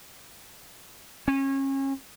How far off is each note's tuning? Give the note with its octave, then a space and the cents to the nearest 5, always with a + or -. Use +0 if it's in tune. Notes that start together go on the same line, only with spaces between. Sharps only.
C#4 -30